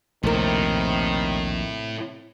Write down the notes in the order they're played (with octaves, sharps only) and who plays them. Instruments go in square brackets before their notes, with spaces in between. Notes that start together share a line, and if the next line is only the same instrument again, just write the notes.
[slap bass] A#1 D#2 [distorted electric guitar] A2 [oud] C3 A#4 [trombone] D#3